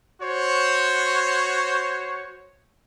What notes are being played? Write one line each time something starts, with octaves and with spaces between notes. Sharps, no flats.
F#4 C5 C#5